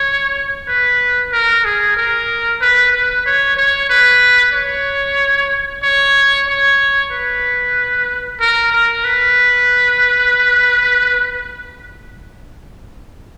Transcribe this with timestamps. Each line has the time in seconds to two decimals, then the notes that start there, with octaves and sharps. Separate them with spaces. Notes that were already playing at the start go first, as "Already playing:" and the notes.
Already playing: C#5
0.68 B4
1.32 A#4
1.65 G#4
1.97 A#4
2.61 B4
2.92 B4
3.26 C#5
3.57 C#5
3.89 B4
4.53 C#5
5.83 C#5
6.47 C#5
7.11 B4
8.40 A#4
8.72 A#4
9.04 B4